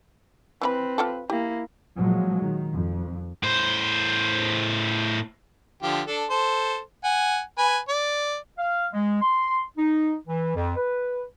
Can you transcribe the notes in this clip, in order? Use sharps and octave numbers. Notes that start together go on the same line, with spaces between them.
E3 C4 E4 B4 B5
F4 G4 A4
A#3 E4 G4
A#2 F3 F#3 G#3
D#3
F2
A2 C5
D3 F3 G4
D4 A4
A4 C5
F#5 G#5
B4 G#5
D5
F5
G#3
C6
D#4
E3
F2
B4